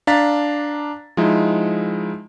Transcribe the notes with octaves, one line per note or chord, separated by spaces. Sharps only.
D4 F5 A#5 A6 B6
F3 G#3 D#4 E4